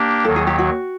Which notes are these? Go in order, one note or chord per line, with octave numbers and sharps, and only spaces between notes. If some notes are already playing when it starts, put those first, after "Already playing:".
Already playing: A#3 D4 G4
D#2 D#3 F#3 A4
G#4
G4
F#4